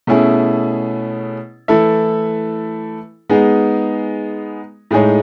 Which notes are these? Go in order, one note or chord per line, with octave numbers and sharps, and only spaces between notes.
B2 A3 C#4 E4 G#4
E3 A3 E4 A4 E5
G#3 B3 D#4 G#4
A2 G#3 D#4 G#4 C#5